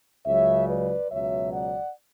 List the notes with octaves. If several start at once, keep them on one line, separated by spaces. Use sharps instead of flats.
C#2 C#3 F#3 C#5 E5
B4 D5
C#2 B2 F#3 C#5 E5
D5 F#5